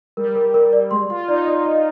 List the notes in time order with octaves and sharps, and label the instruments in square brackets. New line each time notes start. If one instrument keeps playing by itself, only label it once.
[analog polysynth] G3 [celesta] A#4
[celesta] A#4
A#4
D5
[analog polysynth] G#3 [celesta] C6
[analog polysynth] F4 [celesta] C6
[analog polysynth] D#4 [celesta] D5
[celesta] D5
D#5